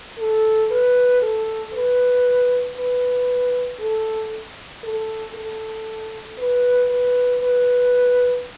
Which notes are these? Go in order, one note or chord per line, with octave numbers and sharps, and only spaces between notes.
A4
B4
A4
B4
B4
A4
A4
A4
B4
B4
B4